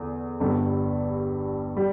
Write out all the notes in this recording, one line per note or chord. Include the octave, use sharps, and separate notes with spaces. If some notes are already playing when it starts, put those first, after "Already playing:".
Already playing: E2 D3
G1 G2 G3 D4 A4
G3